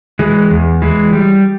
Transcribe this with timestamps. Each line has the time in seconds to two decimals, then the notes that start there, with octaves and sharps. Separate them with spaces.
0.19 E3 G#3
0.51 E2
0.82 E3 G#3
1.13 G3